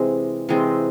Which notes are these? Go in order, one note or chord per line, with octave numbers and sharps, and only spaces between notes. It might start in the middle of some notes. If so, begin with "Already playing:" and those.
Already playing: C3 E3 G#3 C4
C3 E3 G#3 C4